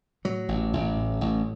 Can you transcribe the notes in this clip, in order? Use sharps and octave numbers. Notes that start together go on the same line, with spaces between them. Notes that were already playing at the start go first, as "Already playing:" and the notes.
A2 F#3
A1
A1
A2
A1